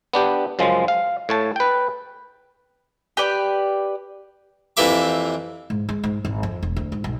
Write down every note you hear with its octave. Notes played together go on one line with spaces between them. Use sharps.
B3 D4 G4
F#2 C#3 F3 G#3
F5
A2 C#5 A5
B4 G5
G4 B4 D5
F2 C3 E3 A#3 E5 D6
G#2
G#3
G#2
G#1
F2
E1
D2
G#2
B1